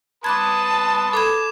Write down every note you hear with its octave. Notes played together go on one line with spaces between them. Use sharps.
B4 A5 C6 D6 D#6 F#6 G#6
A4 B5 D6 G#6 E7